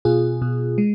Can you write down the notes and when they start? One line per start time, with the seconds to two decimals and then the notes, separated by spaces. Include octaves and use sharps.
0.05 B2 F4 G#4
0.42 B2
0.78 G#3